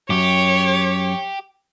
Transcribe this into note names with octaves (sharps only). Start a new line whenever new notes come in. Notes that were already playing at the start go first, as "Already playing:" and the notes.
F#2 G4 C#5